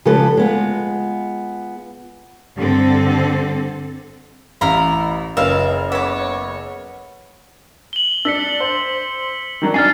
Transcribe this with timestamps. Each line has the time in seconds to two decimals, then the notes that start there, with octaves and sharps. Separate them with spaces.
0.05 C#3 F3 G#3 G4 A4 B4
0.37 G#3 B3 F4
2.56 G2 D3 C4 A4
4.61 A1 E4 F5 A#5 B5
5.37 F#1 C#2 E5 F5
5.92 B3 C#5 E5 D6
7.93 F#7 G7
8.25 D4 E6 B6 C#7
8.60 C5
9.62 D#3 F#3 D4
9.74 D4 G#5 F6 A6 C7